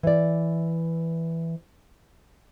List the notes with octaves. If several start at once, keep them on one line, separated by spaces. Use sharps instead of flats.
E3 D5